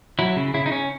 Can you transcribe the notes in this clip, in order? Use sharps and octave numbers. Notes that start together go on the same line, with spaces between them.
F#3 E4
C#3
C#3 E4
D#4
C#4